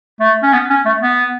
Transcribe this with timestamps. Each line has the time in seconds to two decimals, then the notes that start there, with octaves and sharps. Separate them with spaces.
0.20 A3
0.43 C#4
0.53 B3
0.70 C#4
0.86 A3
1.02 B3